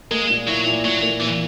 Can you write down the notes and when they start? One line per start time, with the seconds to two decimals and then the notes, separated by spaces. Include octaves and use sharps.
0.11 G#3 A#3
0.29 A#2
0.47 F#3 E4
0.66 A#2
0.85 A#2 F#3
1.03 A#3
1.21 A#2 E3